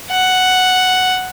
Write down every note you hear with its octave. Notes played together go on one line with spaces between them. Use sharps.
F#5